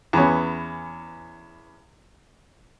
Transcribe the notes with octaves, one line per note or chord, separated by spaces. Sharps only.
E2 B3 C#4